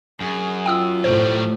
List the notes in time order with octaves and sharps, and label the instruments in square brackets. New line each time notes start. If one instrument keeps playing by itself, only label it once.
[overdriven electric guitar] F#2 [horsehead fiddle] G#4
[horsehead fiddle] F4 [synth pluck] G5 D#6 E6
[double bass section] A2 [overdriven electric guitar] F#3 G3 [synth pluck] C5